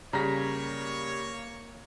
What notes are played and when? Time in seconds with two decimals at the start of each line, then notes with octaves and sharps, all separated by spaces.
0.13 C#3 G3 A#3 C#5 A#5 A#6 B6